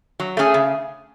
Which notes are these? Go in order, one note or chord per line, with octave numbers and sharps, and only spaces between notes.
F#3
A3 C#4 G#4
C#3